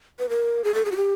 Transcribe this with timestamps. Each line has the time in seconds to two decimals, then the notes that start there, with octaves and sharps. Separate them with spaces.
0.19 B4
0.29 A#4
0.64 G#4
0.74 A4
0.85 G#4
0.92 F#4
0.96 G4